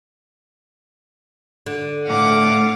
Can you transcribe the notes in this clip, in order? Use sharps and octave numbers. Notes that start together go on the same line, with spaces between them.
D3
A2 F5 F#5 D6